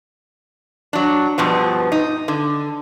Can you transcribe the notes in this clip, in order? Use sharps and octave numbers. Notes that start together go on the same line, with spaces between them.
F#3 D4
G2 B2 F3 B3
D#4
D3